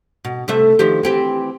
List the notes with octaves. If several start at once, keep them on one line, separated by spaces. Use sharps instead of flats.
B2
C3 A3 E5
D#3 F3 G4
E3 C4 G4